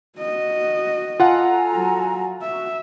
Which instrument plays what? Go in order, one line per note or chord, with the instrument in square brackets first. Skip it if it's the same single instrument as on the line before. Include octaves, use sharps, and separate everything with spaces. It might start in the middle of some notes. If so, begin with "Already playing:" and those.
[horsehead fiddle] F#4 D#5
[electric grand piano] F4 F#5 [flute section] A4 G#5 A#5
[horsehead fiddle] F#3 F#4
[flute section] F#4 [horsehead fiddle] E5